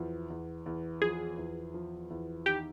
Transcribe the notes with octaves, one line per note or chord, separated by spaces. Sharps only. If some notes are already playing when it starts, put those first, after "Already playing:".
Already playing: E2 F3
E2
E2
F3 G#4
E2
F3
E2
D#3 G4